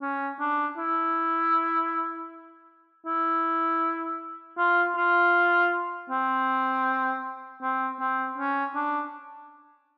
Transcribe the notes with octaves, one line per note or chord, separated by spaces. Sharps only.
C#4
D4
E4
E4
F4
F4
C4
C4
C4
C#4
D4